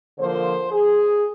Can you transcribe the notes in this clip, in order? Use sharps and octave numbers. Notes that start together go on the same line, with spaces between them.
D3 F3 A#3 C5
G#4